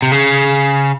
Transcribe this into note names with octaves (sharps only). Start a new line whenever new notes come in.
C3
C#3